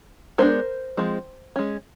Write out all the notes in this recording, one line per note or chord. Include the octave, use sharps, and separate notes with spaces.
G#3 B3 D4 A#4 C5
F3 G#3 C4
G#3 C#4